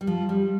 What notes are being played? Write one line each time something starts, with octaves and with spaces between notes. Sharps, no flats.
G3
F3
G3